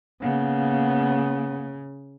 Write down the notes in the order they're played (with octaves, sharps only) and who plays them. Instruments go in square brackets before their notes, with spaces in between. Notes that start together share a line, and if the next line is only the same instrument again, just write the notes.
[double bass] C#3 [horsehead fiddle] A#3 B3